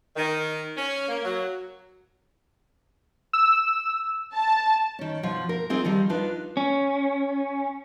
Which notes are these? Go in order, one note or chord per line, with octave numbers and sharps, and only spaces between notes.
D#3
C#4
A#3
F#3
E6
A5
D#3 C#4
B2 F3
A#4
C4 D#4 F4 G#4 A#4
D#3 F3 G3
D4 D#4 F4 B4
C#4